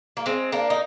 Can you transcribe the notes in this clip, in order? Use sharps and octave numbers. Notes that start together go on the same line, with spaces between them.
A#3
G#3 C4
A#3 D4
D#4